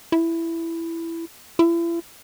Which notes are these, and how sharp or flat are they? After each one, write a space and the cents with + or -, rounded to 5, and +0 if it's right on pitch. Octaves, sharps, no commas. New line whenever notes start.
E4 +10
E4 +40